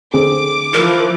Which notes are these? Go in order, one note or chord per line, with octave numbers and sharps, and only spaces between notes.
D3 C4 G#4 D6
E3 F3 A#4